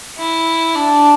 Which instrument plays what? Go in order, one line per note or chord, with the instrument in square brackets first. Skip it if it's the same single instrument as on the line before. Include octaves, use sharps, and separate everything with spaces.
[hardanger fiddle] E4
D4